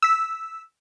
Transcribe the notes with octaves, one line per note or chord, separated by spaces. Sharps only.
E6 B6